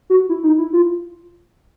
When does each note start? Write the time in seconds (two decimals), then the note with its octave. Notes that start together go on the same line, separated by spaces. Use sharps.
0.10 F#4
0.29 E4
0.43 D#4
0.58 E4
0.73 F4